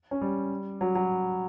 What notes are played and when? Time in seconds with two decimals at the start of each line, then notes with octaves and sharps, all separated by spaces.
0.11 C#4
0.21 G3
0.81 F#3
0.95 F#3